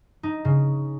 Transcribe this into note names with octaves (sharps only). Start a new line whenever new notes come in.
D#4
C#3